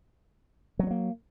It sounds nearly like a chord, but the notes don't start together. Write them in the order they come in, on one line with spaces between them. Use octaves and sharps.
F#3 B3 G3 A#3